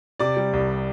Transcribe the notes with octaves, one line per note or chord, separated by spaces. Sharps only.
C3 D5 D6
G3
C2